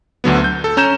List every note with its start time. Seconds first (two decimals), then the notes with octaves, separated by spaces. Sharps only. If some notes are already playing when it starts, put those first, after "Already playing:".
0.24 D2 D3 F#3 B3
0.44 G6
0.64 A4
0.77 C#4 A#5 G6 E7